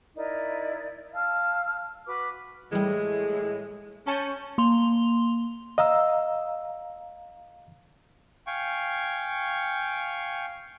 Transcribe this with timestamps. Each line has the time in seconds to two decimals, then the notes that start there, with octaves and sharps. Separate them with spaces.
0.16 D#4 E4 A#4 D5
1.14 F5 A5 E6 F6
2.07 F#4 B4 D6
2.72 A2 E3 G3 G#3
4.07 C#4 A5 C#6 G6
4.58 A#3 C6 F7 G7
5.78 D#5 F5 A#5 E6
8.47 F5 G5 G#5 C#6